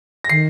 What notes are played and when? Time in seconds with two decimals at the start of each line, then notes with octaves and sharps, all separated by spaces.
0.24 A#6
0.29 D#3 C7